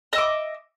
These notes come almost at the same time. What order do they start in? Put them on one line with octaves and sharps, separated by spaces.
D#5 E5 D6